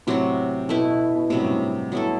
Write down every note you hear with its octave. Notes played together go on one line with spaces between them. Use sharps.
A2 C3 F#3 C4 F#4
B2 A3 E4 B4
B2
B2
A2 C3 F#3 B3
G2
A2
A2
F#3 B3 E4 A4